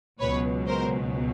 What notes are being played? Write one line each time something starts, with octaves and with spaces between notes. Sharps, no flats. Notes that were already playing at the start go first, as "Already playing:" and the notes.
C#2 B2 F#3 B4 C#5
A#4 C5